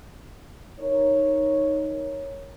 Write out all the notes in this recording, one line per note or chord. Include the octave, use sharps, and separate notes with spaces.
D#4 A#4 C#5